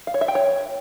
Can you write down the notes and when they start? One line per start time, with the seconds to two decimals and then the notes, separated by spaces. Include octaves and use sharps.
0.07 F5
0.14 C#5
0.21 E5
0.28 G5
0.35 C#5